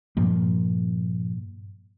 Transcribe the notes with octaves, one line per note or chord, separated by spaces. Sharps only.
G2 A#2 F3 A#3